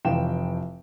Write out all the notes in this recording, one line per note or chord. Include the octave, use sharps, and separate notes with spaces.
F1 E3 F3 F4 G5 E7